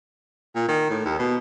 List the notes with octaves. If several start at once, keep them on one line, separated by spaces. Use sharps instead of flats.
A#2
D#3
A2
D#2
B2